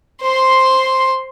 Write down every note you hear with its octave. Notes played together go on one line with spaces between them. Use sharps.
C5 C6